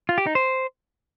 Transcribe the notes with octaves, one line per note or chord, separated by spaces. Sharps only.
F4
G4
D#4
C5